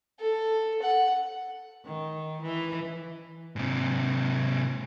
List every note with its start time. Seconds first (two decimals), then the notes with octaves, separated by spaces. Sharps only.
0.20 A4
0.82 F#5
1.85 D#3
2.41 E3
3.56 G#2 C3